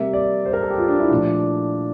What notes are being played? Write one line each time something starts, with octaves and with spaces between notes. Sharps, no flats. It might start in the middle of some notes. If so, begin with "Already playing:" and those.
Already playing: C3 G3 A#3 E5
D5
C5
A#4
A4
G4
F4
D4
E4
A#2 F3 A3 D4